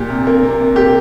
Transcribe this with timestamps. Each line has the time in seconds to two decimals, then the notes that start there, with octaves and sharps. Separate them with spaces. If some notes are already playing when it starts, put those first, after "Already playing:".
Already playing: A#2 G4
0.10 C3
0.27 A#3
0.43 C3
0.60 C3
0.76 A#3 G4